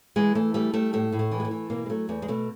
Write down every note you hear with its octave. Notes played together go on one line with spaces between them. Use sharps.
E3 G#3
E3 A3
G3 A3
G3 A3
A2 A3
A2
A3
E3
G#3
A3
E3
B2 A#3
G#3
F#3 A3
E2 A3
G#3
B2 A3